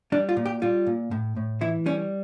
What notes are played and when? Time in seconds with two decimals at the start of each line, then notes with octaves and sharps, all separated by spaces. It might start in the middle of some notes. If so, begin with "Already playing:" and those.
0.12 G3 D4
0.29 F4
0.37 A#2
0.46 G4
0.62 G3 F4
0.87 A#2
1.11 A2
1.37 A2
1.61 E3 E4
1.86 G3 C#4